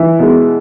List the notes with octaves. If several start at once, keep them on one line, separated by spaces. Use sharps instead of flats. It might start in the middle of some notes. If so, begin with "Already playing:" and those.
Already playing: E3 E4
B2 G#3